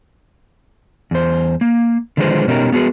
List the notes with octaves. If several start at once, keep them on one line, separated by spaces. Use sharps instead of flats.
E2 C5
A#3
D3 D#3 F3 G#3 B4 C5
B2 B3 C#4 D#4 G4 A#4
B3 F#4 G#4 B4